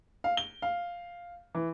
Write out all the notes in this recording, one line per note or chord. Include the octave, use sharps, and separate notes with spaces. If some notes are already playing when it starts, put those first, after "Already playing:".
F5
G7
F5
E3